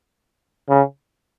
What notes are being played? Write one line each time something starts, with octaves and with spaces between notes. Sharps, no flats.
C#3